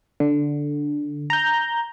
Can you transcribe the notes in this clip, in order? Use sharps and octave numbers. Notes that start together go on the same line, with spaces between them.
D3
A#5 G6